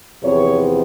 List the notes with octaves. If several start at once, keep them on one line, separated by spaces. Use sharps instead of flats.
E2 C3 F3 C#5